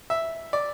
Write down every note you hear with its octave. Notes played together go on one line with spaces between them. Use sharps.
E5
D5